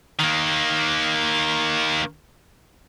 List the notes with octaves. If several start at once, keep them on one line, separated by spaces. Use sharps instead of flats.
D#3 A#3